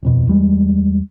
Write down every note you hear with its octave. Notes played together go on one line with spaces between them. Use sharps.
D#1 F2 B2
E2 G3 G#3